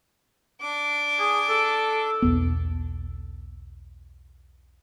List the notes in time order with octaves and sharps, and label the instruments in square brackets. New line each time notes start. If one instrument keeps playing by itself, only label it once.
[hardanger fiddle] D4 D6
[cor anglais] G#4
A4
[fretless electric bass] B1 E2 B3